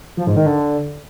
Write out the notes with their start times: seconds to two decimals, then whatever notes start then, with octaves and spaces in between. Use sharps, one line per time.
0.17 F3
0.27 G#2
0.36 D#3
0.46 D3